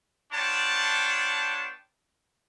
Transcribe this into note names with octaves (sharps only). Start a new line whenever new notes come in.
B3 D4 F4 C#5 G5 A5